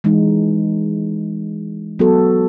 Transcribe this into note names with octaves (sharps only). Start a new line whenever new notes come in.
E3 G#3 D#4
F#3 B3 F#4 A4